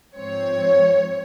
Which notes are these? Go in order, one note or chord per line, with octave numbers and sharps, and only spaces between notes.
G#2 F3 C4 C#5